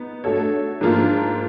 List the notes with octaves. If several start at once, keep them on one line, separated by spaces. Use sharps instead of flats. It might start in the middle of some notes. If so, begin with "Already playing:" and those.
Already playing: B3 D#4
A3 D4 F#4 A4 C#5
G#2 F3 A#3 D4 F4